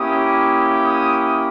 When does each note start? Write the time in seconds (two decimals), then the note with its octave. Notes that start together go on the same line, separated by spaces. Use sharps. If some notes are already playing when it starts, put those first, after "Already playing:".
Already playing: A#3 C#4 E4 G4 D#6
0.83 D#6